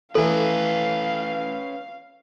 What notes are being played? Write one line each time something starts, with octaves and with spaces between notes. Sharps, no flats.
E3 A3 C#4 A4 B4 F5